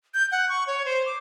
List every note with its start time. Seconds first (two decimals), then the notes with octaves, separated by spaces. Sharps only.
0.14 G6
0.32 F#5
0.49 C#6
0.67 C#5
0.85 C5
1.06 D6